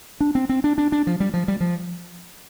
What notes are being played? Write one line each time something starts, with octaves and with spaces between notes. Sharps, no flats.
D4
C4
C4
D4
D4
D4
F3
G3
F3
G3
F3